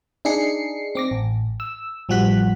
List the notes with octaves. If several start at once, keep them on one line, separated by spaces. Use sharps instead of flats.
D4 D#4 G#4 C7 C#7
C4 D6 A#6
A1
E6
A1 F3 G3 F#4 F#6 B6